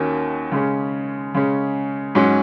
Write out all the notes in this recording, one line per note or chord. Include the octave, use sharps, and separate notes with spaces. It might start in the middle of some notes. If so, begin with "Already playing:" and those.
Already playing: D#2 D#3 A#3 C#4 F#4
C#3 G#3 C#4
C#3 G#3 C#4
G#2 F#3 C#4